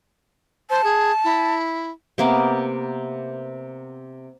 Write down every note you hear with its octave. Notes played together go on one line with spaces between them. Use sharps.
C5 A5
G#4
E4
C3 A#3 B3